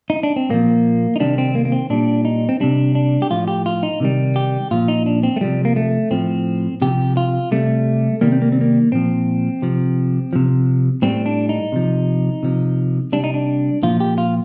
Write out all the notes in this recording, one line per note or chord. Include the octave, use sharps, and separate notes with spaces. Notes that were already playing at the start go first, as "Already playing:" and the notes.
D#4
D4
C4
A#2 F3 A#3
D#4
C3 D#3 G3 D4
C4
A#3
A#3
C4
A#2 G3 D4
D#4
C4
C3 G3 D4
D4
G4
A2 F3 F4
G4
F4
D#4
C3 D#3 G3
G4
A#2 F3 F4
D#4
D4
C4
A3
C3 F3 G3
A#3
A3
A2 F3 C4
C3 F3 G4
F4
C3 G3 A3
C3 D#3 G3 A#3
C4
A#3
C4
A#3
A#2 F3 C4
C3 F3
C3 F3
A2 G3 C4
D4
D#4
C3 F3
C3 F3
C3 G3 D4
D#4
D4
A#2 F3 F4
G4
F4